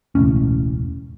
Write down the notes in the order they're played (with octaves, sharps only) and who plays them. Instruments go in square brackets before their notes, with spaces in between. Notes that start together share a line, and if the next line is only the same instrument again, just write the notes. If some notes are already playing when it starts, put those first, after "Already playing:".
[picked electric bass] E1 C#2 A2 C#4